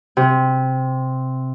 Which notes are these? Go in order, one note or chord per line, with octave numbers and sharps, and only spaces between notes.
C3